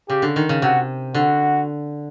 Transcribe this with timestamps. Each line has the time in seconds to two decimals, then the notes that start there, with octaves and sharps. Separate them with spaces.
0.09 C#3 G4
0.22 D3
0.36 D#3
0.49 C#3
0.62 C3 F#4
1.14 D3 F#4